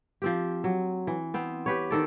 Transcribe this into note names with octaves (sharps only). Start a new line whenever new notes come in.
F3 C4 G4
F#3
E3
B3 C4
G4 B4 C#5
D#3 A4 D5